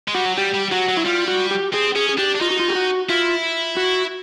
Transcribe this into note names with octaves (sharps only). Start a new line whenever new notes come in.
G#3
G3 F#4
F#3
G3 G4
G3
F#3 F#4
F#3
E4
G3 F4
F#4
G4
C4 G#4
C#4 G#4
G#4
D4 G4
D4
D#4 F4
F#4
F4
G4
F#4
E4 F4
F#4